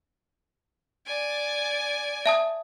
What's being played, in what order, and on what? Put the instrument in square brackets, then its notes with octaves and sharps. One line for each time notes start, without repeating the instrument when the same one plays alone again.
[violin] D5 G#5
[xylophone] E5 A5 D#6